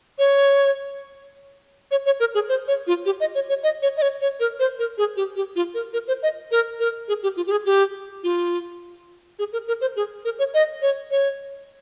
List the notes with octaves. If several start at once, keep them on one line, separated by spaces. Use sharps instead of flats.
C#5
C#5
C#5
A#4
G#4
C5
C#5
F4
G4
D#5
C#5
C#5
D#5
C#5
D#5
C#5
C#5
A#4
C5
A#4
G#4
G4
G4
F4
A#4
A#4
C5
D#5
A#4
A#4
G#4
G4
F4
G4
G#4
G4
F4
G#4
A#4
A#4
C5
G#4
A#4
C#5
D#5
C#5
C#5